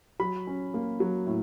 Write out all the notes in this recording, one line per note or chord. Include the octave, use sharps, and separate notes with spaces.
F#3 B5
C#4
A#3
F#3
A2